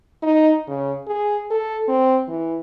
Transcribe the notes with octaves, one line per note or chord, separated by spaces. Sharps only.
D#4
C#3
G#4
A4
C4
E3